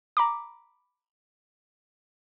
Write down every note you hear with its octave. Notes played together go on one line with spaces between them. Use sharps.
A#5 B5 D6